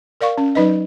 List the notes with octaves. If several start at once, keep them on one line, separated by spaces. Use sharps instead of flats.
A#4 D5 F5 C#6
C#4
F#3 D#4 B4 D#5